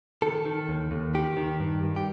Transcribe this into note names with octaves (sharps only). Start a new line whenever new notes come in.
D#3 A4
D#3
D#2
D#2
D#3 G4
D#3
G2
G2
G4